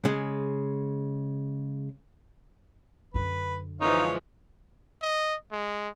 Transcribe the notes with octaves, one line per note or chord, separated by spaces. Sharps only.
C#3 G#3
F#2 D3 B4
E3 F3 G#3 D#4 C#5 F5
D#5
G#3